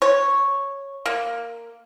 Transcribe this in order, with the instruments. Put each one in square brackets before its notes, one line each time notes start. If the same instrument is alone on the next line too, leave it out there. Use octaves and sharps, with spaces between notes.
[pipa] C#5
A#3